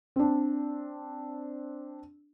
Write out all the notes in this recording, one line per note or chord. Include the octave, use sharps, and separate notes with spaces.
C4 D4